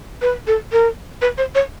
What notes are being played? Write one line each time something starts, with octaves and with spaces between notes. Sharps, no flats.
B4
A4
A#4
B4
C5
C#5